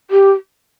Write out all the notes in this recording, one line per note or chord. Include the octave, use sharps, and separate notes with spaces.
G4